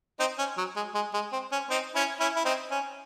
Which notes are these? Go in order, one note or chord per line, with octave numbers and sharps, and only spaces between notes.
C4 D#4
C#4
F#3
G#3
G#3
G#3
C4
C#4
C4 D#4
C#4 E4
C#4 E4
E4
C4 D#4
C#4